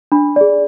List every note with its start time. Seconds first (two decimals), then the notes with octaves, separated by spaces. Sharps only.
0.12 D4 B5
0.36 G#4 D5